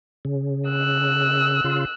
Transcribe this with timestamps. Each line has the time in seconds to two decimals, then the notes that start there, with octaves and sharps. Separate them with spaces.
0.25 C#3
0.69 E6 F#6
1.64 C#3 F4